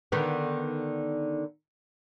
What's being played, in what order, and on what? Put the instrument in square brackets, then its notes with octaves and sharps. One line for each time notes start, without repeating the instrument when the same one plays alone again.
[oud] D3 D#3 B3